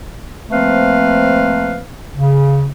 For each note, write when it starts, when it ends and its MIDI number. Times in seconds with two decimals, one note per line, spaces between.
0.50 1.80 53
0.50 1.80 57
0.50 1.80 58
0.50 1.80 60
0.50 1.80 71
0.50 1.80 77
2.15 2.66 49